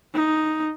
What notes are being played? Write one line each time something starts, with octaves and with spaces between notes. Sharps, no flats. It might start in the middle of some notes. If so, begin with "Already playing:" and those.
D#4